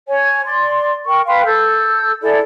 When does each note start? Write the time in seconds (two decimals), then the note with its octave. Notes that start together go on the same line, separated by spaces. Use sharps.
0.08 C#5 G#5
0.45 D5 C6
1.07 A#4 G5 C#6
1.27 B4 F5 G5 C6
1.45 A4 E6 G6
2.21 E4 G#4 A4 D5